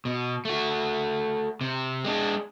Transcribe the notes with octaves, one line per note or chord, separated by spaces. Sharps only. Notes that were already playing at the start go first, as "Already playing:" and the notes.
B2
A3 F#4
C3
G#3 D4